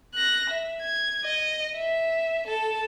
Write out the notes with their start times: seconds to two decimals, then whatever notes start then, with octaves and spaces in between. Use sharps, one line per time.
0.14 F#6 A#6
0.50 E5
0.82 G#6
1.24 D#5
1.76 E5
2.47 A4 A5